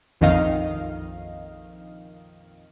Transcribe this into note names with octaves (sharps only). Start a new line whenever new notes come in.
A#1 F2 D#3 D#5 F5